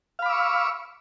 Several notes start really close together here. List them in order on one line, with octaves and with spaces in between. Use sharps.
F5 B5 D6 E6 C#6